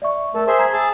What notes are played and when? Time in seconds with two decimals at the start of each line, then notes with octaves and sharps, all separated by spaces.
0.02 D5 E5 C#6
0.34 A3 A4 A#4
0.47 G#4 C5 E5
0.59 A#5 G#6 B6
0.73 G#4 A5 E6